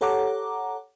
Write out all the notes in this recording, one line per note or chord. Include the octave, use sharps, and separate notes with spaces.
G4 A4 C#5 F#5 A#5 D6